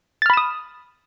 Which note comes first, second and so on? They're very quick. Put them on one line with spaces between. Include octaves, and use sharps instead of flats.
A6 F6 B5 E7 D#6